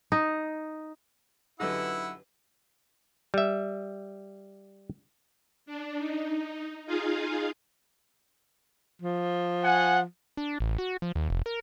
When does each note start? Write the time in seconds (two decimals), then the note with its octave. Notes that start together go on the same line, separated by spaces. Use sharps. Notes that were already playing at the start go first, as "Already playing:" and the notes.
0.12 D#4
1.60 F#2 D3 D#4 E4 G4 B4 F#5 E6
3.34 G3 E5
5.66 D4
5.98 D#4
6.86 D#4 F4 G#4 F5
9.02 F3
9.63 F#5 G#5
10.37 D4
10.60 A1
10.78 F#4
11.02 F3
11.15 D#2
11.30 F1
11.46 A#4